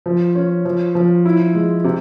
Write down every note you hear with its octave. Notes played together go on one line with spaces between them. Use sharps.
F3
C#4
F3
F3
E4
G#3
C3